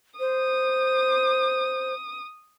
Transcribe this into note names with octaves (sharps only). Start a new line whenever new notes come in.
C5 D#6